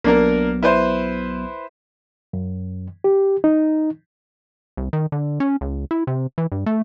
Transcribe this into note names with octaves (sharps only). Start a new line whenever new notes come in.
B1 F#3 A#3 B3 D4 A#4
E4 B4 C5
F#2
G4
D#4
C2
D#3
D3
C#4
C#2
E4
C3
E3
G2
A3